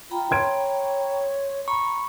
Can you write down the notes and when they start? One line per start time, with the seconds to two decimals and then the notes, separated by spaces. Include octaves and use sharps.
0.11 F4 G5 A#5 B5
0.31 C#5 C6 G#6 D7
1.68 A#5 B5 C#6